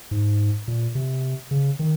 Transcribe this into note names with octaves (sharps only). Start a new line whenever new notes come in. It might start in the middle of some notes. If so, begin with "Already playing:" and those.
G#2
A#2
C3
C#3
D#3